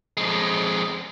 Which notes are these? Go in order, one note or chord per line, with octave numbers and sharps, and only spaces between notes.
F2 G#3